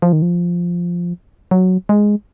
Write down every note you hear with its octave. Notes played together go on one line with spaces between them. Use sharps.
F3
D#3
F3
F#3
G#3